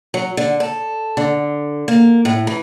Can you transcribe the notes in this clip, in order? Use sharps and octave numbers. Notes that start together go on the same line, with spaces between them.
F#3
D3
A4
D3
A#3
A2
E3